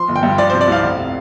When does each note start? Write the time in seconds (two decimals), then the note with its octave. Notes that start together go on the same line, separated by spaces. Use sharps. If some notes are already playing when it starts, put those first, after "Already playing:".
Already playing: F3 C6
0.09 G1
0.16 G5
0.23 G2
0.38 F3 D5
0.50 C5
0.53 C3
0.61 D5
0.68 C2 F5
0.83 F1
0.98 C3